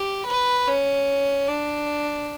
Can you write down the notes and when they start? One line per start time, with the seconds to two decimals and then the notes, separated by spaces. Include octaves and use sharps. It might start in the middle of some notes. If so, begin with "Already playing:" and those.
Already playing: G4
0.27 B4
0.67 C#4
1.48 D4